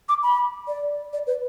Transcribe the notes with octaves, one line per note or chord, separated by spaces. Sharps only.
D6
B5
D5
D5
B4